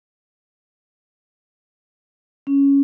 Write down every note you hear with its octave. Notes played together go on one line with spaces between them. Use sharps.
C#4